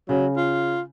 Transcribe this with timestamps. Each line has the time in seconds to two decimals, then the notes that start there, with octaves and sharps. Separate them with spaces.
0.09 C#3 F#3
0.36 F4